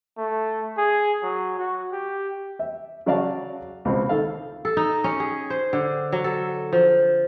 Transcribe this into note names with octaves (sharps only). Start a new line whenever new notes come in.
A3
G#4
F#3
F#4
G4
E5
C#3 F#3 F#4 D5 F5 A5
C#2 B2 C4
D#3 A4 F5
A4
D#4
C#4
G#4
C5
D3
F#3
A4
F3